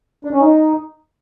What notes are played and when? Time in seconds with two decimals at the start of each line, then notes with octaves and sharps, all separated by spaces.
0.25 D4
0.33 C#4
0.41 D#4